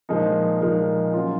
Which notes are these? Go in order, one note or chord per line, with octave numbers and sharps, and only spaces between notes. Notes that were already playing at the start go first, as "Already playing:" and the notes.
A#2 F3 G#3 D#4 A#4
A#2 F3 G#3 D#4 A#4
F#3 C#4 F4